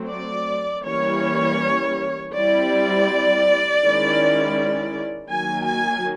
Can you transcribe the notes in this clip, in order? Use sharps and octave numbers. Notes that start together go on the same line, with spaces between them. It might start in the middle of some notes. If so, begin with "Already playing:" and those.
Already playing: F#3 A3 C4
D5
E3 G3 A#3 C#4 C#5
G3 C4 E4 D5
D#3 G#3 C#4 E4
D#3 F#3 A#3 G#5
G#5